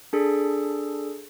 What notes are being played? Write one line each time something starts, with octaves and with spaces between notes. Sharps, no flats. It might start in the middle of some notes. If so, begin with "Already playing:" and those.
D4 G#4 A4